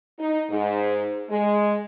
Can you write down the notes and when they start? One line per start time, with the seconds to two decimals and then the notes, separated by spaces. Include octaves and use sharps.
0.19 D#4
0.50 G#2
1.29 G#3